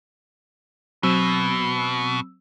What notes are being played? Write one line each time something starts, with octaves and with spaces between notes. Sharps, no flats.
B2 F#3 C4 E6